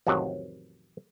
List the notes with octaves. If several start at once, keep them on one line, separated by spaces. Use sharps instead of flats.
A1 F2 C3 D#3 F#3